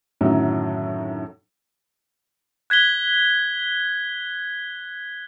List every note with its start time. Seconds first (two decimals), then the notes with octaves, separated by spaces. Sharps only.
0.21 F#2 A2 D3 D#3 F#3
2.70 F#6 G#6 B6 G7